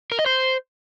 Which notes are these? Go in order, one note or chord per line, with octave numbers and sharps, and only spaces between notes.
A#4
D#5
C5